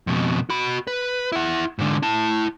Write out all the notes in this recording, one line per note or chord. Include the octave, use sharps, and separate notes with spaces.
F2 B2
F#4 B5
B4
E4 F#5
G#2 D3
E4 A5